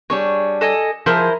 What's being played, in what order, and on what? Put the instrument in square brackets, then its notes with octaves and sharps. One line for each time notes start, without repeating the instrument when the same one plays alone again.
[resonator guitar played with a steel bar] G3 D4 G#4 [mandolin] C#5
[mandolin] A4 D#5 G#5
[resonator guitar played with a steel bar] F3 G#4 [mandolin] E4 A#4 C5